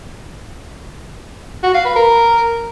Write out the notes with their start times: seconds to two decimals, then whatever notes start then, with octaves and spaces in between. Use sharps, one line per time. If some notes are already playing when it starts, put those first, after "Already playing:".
1.63 F#4
1.74 F5
1.85 B4
1.96 A#4